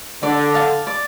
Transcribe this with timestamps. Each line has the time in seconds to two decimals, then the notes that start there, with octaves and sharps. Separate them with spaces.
0.22 D3 D5
0.54 F5 A5
0.87 D5